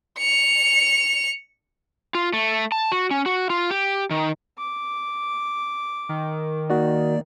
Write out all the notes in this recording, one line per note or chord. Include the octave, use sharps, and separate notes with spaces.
C#7 F7
F4
A3
A5
F#4
C#4
F#4
F4
G4
D#3
D6
D#3
A#3 D#4 F#4 A#4 D5